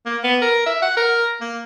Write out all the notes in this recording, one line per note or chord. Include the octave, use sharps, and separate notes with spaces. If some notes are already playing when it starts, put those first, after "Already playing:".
A#3
B3
A#4
E5
F#5
A#4
A#3